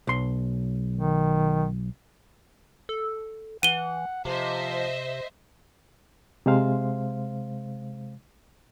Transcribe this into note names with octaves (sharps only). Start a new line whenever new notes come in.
B1 C6
D#3
A4
E3 F#5 D#7 G7
C3 F3 C5 D#5 E5
C3 G#3 C5 F5